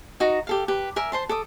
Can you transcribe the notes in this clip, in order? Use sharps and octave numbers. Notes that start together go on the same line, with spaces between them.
D#4 F#4 A#5
G4 A4 F5
G4 B4
A#4 E5 G#5
C5 A5 C6
A4 D6 D#6